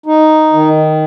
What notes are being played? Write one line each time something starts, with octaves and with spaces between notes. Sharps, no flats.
D#4
D#3